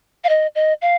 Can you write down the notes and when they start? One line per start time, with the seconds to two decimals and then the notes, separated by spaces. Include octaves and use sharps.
0.24 F5
0.29 D#5
0.55 D#5
0.82 F5